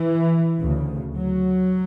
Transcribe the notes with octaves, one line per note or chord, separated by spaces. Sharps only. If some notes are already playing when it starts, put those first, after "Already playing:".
Already playing: E3
D2 C#3
F#3